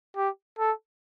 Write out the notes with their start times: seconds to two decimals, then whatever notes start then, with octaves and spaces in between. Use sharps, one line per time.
0.16 G4
0.59 A4